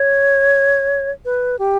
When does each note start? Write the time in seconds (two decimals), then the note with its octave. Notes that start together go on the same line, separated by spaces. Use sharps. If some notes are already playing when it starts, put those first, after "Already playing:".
Already playing: C#5
1.25 B4
1.59 G4